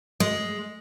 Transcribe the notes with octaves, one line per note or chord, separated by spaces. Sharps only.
G#3